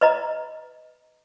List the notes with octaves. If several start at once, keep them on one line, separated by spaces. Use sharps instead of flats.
B4 D#5 A#5